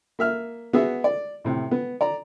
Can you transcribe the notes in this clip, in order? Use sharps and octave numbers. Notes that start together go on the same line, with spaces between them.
A#3 E5 F6
B3 F#4 G#4 E5
D5
A2 C3
B3
D5 A#5